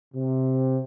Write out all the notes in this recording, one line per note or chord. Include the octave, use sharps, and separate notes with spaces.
C3